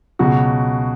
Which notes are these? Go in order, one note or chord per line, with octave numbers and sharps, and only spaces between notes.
C#2 B2 F#3 F#4